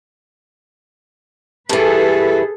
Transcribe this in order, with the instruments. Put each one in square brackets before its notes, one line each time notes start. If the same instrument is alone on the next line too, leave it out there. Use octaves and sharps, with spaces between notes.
[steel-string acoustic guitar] G2 E3 [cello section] G#4 A4 B4